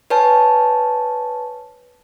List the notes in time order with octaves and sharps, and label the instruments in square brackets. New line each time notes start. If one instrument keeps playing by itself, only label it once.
[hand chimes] B4 C#5 G#5 A5